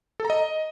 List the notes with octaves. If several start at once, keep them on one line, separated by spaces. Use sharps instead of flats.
A4
A#5
D#5